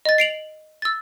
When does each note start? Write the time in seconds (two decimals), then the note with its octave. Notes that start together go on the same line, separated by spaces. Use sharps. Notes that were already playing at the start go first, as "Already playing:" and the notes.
0.05 D#5 A6
0.18 C7 D7 F7 F#7
0.82 E6 A6